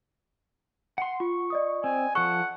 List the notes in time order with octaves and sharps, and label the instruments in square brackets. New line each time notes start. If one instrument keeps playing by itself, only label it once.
[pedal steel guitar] F#5 C6
[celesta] F4 [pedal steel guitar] C#6
[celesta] D5 D#5 D#6
[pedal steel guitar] C4 [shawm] G#5
[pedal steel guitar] F3 A4 [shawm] F#5 [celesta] C#6